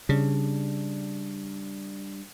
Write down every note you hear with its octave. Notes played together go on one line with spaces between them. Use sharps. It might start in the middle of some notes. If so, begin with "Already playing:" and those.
C#3 G3 D4